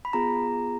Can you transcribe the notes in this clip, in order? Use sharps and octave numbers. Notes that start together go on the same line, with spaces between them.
B5
B3 F4 G#4 A#5